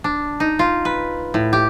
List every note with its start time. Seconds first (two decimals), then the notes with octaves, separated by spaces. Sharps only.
0.04 D4
0.40 D#4
0.59 F4
0.85 B4
1.34 A2
1.53 G4